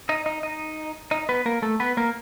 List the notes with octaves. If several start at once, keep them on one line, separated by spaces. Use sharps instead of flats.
D#4 D#5
D#4 D#5
D#4 D#5
D#4 D#5
B3 B4
A#3 A#4
A3 A4
B3 B4
A#3 A#4